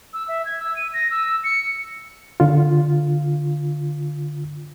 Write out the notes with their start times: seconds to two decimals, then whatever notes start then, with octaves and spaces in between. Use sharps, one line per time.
0.13 E6
0.28 E5
0.45 G#6
0.60 E6
0.76 D#7
0.94 A#6
1.11 E6
1.44 C#7
2.40 D3 F4